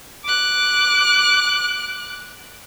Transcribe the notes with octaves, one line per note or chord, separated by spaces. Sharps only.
D6 F#6